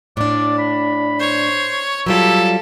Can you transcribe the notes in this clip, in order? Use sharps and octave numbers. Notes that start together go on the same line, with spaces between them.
A2 D4 D5
B5
C5 C#5
F#3 G3 E4 F4 G4 A4